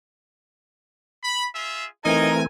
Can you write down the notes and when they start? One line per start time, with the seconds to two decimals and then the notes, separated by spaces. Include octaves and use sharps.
1.24 B5
1.55 F4 G#4 E5
2.05 E3 A3 C4 D#4 A#4 G#5